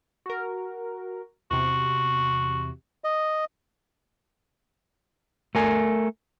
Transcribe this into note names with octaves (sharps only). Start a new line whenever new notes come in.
F#4 A#4
E2 C3 F#4
D#5
A3 A#4 G#5